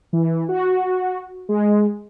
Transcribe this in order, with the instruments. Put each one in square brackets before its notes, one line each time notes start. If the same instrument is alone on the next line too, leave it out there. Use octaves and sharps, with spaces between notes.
[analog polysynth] E3
F#4
G#3